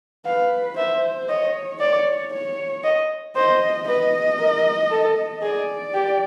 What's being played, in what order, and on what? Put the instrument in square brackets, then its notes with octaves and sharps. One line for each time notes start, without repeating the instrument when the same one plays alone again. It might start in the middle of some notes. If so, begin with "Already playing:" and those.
[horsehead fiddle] B4 [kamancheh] F5
[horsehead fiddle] C5 [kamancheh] E5
[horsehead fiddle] C#5 [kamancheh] D#5
[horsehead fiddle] C#5 [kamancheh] D5
[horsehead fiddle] C#5
[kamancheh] D#5
[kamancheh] C5 [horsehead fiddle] D#5
[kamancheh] B4 [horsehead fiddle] D#5
[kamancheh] A#4
A4
[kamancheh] G#4 [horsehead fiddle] D5
[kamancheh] G4